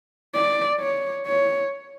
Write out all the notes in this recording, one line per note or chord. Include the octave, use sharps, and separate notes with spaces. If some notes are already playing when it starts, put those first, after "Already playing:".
D5
C#5
C#5